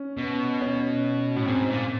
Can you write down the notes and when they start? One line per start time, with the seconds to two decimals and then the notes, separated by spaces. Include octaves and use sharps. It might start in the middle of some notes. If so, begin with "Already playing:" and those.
Already playing: C#4
0.17 B2
0.61 C#4
1.36 A2
1.46 G#2 C4
1.68 A#2